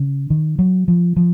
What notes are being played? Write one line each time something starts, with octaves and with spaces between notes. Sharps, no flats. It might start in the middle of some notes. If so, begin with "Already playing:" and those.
Already playing: C#3
D#3
F#3
F3
F3